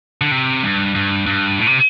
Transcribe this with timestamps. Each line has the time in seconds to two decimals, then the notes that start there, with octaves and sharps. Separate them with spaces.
0.21 D3
0.32 C3
0.63 G2
0.95 G2
1.26 G2
1.58 A2
1.67 C3